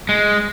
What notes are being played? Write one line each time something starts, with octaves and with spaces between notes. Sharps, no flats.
G#3